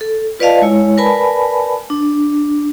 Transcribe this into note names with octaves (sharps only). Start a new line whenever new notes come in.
A4
F4 B4 D5 D#5 F5 A5
G#3 E4 C#5
A#4 B4 D5 G#5 A5 B5
D4